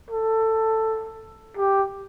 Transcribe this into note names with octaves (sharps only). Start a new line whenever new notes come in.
A4
G4